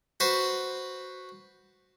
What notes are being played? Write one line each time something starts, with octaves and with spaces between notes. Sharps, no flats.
F#4 B4 C5